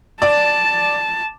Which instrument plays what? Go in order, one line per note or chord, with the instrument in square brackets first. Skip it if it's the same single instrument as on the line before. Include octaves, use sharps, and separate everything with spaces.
[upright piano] D5 [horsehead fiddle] A5